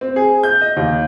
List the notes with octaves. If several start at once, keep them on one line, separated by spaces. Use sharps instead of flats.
C4
G#4
G6
D#5
D#2